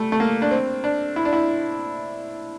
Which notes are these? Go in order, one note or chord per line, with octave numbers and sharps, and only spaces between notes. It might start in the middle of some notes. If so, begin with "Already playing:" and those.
Already playing: G3 A3
A3
A#3
D4
C4
D4
E4
D4
E4